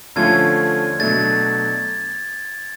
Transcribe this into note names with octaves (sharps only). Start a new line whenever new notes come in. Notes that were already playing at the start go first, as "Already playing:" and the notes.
D3 F3 A3 C#4 F4 G#6
B2 F#3 A3 D4 A6